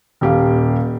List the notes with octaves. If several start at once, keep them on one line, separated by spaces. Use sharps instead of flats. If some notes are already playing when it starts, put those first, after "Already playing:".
D#1 G4 F5